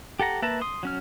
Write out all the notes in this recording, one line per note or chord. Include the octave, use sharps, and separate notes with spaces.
G4 A4 F#5 A#5
A#3 B4 E5 A5 A#5
C6 D#6
F#3 C#4 F6